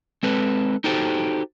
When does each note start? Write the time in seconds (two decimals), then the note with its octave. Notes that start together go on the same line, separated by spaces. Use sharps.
0.23 G#3 C4 A4 B4
0.84 D#4 F#4 G4 A4 C5